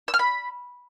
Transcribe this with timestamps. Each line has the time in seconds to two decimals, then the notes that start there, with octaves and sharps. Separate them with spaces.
0.08 E6
0.14 F6
0.19 B5